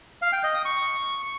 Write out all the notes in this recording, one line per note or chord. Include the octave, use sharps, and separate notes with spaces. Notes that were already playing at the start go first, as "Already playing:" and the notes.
F5
G5
D#5
D#6
C#6